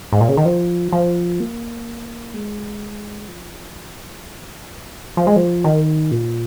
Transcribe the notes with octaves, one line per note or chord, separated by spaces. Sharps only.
G#2
A#2
C#3
D#3
F3
F3
A#3
G#3
F3
F3
G#3
F3
D#3
A#2